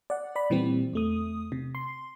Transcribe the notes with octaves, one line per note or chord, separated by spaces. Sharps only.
D5 F#5
D5 B5
A#2 E3 G3 C4
E2 A3 D#6
C3
C6